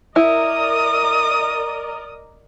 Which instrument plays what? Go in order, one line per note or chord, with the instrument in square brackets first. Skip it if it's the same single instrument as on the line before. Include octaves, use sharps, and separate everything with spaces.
[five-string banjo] E4 [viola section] A#4 D5 D#5 [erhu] D#6